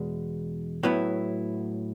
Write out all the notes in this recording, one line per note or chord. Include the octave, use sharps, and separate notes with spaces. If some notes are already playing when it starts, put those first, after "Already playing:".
Already playing: E2 B2 G#3
A2 F#3 B3 E4